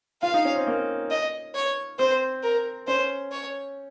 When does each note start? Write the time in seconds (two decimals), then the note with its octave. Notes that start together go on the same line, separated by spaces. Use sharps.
0.23 F4 F5
0.34 D#4
0.45 C#4
0.56 C4
0.67 A#3
1.11 D#5
1.55 C#5
1.99 C4 C5
2.43 A#4
2.87 C#4 C5
3.32 C#5